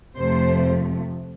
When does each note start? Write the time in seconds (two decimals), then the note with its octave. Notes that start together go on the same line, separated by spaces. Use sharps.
0.17 F2 C3 F3 A3 C5